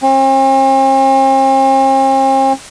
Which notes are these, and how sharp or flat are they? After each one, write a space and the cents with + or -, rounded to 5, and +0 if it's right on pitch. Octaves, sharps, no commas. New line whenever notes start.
C4 +45